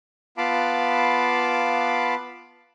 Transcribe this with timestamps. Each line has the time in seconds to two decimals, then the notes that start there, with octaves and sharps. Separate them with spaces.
0.38 B3 F4 F5 A5 B5 D6